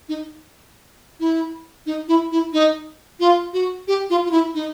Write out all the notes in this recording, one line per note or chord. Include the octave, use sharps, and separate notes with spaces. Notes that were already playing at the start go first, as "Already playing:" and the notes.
D#4
E4
D#4
E4
E4
D#4
F4
F#4
G4
F4
F4
E4
D#4